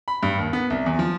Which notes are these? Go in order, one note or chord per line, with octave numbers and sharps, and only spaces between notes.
B5
G2
D#2
B3
C2
E2
F3